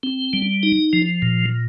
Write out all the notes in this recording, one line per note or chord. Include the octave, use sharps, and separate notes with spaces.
C4
G3
D#4
F3
A#2